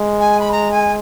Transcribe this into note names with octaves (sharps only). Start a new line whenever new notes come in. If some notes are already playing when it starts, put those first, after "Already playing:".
Already playing: G#3
G#5
B5
A#5
G#5